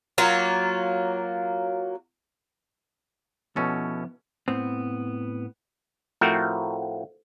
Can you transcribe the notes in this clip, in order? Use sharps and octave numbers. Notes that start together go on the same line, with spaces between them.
F#3 A#3 F4
B2 F3 B3 C#4 E4 A4
A2 B3 C4
A2 F3 A3 C4 F#4 A#4